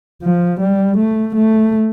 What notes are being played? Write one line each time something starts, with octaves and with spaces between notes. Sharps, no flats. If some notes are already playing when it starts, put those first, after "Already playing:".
F3
G3
A3
A3